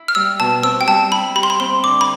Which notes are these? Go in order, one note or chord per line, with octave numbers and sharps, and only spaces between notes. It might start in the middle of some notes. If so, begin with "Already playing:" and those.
Already playing: E4
F6
G3 E6
B2 A5
C4 E6
G5
G3 A5
E4 B5
G4 B5
C6
B5
C4 C6
D3 D6
B5